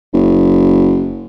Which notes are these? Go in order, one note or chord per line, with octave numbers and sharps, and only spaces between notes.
F#1